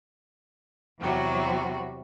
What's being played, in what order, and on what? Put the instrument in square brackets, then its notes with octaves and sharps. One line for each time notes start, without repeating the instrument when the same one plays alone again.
[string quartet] E2 C3 F#3 G3 F#4